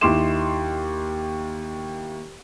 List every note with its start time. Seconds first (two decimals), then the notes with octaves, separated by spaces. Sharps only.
0.01 D#2 D#4 E4 C6 D6 E7